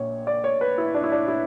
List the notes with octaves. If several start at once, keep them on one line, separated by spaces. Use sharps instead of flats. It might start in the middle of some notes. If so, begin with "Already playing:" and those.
Already playing: A#1 A#2 C#5
D5
C#5
B4
E4
D4
E4
D4
E4